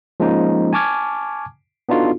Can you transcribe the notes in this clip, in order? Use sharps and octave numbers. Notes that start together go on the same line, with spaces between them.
F3 G#3 A#3 C#4 D#4
G#5 A5 C#6 D6 F6 G#6
B3 D4 D#4 F4 F#4 A4